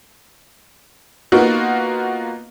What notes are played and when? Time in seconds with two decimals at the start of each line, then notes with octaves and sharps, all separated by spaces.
1.32 A#3 B3 D#4 F4 F#4